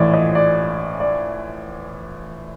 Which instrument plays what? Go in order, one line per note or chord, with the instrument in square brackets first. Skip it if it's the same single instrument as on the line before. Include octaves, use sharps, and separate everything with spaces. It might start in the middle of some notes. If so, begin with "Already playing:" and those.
Already playing: [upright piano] A#1 A2 E3 [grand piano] C#5 D5
[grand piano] D#5
D5
D5